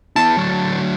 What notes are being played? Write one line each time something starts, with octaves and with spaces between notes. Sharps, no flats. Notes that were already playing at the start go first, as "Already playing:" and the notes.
B3 E4 A5
D2 F#3